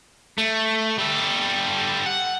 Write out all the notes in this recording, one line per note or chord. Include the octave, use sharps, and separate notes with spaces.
A3
G3 A4
F#5